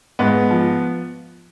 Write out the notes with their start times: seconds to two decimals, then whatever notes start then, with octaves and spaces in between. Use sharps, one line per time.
0.19 G#2 B3
0.50 F3